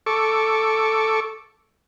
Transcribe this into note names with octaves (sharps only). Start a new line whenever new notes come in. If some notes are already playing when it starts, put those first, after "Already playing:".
A4 C#6 D6